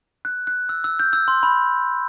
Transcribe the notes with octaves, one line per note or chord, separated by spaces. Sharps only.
F#6
F#6
E6
E6
G6
E6
C6
B5